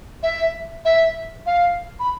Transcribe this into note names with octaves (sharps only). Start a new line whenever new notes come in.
E5
E5
F5
B5